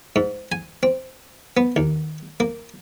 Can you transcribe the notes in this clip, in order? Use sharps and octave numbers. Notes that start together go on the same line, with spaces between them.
G#2
G#5
C4
B3
D#2
A#3